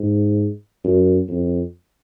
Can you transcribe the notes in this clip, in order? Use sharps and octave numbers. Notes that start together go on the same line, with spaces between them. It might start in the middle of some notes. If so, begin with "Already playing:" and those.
Already playing: G#2
F#2
F2